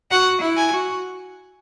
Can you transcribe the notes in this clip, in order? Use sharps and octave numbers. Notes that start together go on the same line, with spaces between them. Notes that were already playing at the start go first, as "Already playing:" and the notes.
F#4 F#5
E4
G#5
F#4